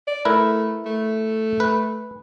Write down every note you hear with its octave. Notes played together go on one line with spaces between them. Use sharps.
D5
A3 E4 A#4 B4
A3
B4